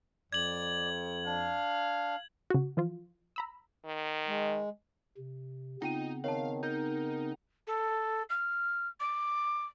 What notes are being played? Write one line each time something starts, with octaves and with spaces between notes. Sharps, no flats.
F2 D5 G#6 F#7
D4 F5
C#3 F#4
E3 F3 F4
A#5 B5 E6
D#3
G#3
C3
C#3 B3 C4 D#4 F4 G5 D#7
D#3 C#5 F5 A5
D#4 A#4 G6
A4
F6
D6